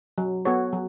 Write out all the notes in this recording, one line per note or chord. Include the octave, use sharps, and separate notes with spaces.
F#3
B3 F#4 A4 C#5
F#3